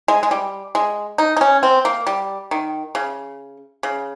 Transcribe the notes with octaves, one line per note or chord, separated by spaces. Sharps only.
G#3
G#3
G3
G#3
D#4
D#4
C#4
C4
A#3
G3
D#3
C#3
C#3